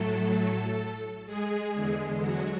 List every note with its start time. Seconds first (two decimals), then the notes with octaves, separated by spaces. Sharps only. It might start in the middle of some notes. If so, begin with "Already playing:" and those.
Already playing: A2 F#3 A3 A4
1.26 G#3 G#4
1.74 E2 D3 G#3
2.22 F#3 F#4